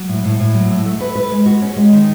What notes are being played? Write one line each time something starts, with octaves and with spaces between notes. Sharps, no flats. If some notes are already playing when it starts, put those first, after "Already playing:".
Already playing: F#3
A2
A2
A2
F#3
A3
A3
B4
B4
G#3
F#4
C#4
G#3
D#3